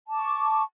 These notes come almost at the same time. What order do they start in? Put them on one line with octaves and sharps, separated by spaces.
A5 D6 C#6